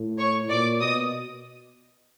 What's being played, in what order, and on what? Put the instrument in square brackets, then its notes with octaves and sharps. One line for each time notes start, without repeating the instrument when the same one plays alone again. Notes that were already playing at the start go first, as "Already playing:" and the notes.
Already playing: [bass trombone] A2
[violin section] C#5 C#6
[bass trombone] A#2 [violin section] D5 D6
[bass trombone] B2 [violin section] D#5 D#6